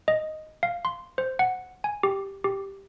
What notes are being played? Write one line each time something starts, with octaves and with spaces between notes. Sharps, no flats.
D#5
F5
C6
C5
F#5
G#5
G4
G4